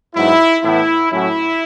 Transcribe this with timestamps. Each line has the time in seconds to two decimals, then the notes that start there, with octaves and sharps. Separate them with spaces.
0.14 G#2 F#3 B3 E4
0.63 A2 E3 B3 E4
1.11 A2 F#3 C#4 E4